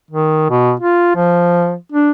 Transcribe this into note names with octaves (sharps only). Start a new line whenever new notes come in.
D#3
B2
F4
F3
D4